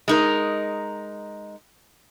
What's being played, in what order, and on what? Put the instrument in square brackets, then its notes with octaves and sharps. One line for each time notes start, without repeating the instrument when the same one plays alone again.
[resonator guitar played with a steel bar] G#3 D#4 A#4